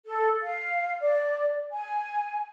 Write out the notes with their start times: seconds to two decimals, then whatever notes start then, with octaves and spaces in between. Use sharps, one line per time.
0.06 A4
0.42 F5
1.01 D5
1.72 G#5